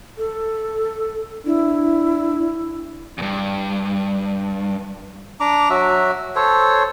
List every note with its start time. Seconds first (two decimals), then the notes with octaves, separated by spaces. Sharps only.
0.18 A4
1.46 D4 E4
3.18 E2 G2
5.40 D4 A#5 D6
5.70 F#3 F#4 E5
6.36 A4 C5 C#5